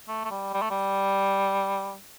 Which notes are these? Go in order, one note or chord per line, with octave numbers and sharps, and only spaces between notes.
A3
A3
G3
G3
A3
G3